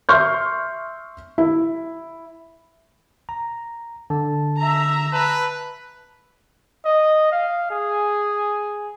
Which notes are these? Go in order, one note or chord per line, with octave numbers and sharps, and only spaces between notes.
E5 C6 C#6 F6 G6
E4
A#5
D3 A5
E5 A#5
B4 A5
D#5
F5
G#4